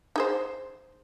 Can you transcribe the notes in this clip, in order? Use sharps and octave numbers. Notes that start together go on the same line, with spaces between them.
D#4 G#4 C5